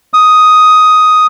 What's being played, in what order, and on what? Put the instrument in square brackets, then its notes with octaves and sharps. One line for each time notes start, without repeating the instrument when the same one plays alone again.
[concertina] D#6